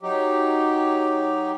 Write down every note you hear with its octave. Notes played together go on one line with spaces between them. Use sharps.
F#3 D#4 G4